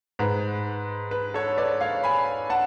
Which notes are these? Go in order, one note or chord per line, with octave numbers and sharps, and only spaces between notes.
G#2 B4
B4
A4 C#5
B4 D5
C#5 F5
G#5 B5
F#5 A5